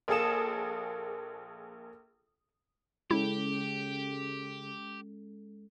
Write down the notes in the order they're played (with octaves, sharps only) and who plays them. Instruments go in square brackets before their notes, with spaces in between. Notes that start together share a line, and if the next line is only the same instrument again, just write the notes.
[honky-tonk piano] A#1 A#3 G#4 A4 D#6 E7
[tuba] C#3 [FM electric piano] G#3 C#4 A4 [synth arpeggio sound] E4 [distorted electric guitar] G4